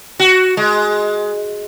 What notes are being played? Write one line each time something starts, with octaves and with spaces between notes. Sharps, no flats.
F#4
G#3